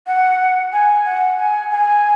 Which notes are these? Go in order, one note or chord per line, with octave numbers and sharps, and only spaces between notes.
F#5
G#5
F#5
G#5
G#5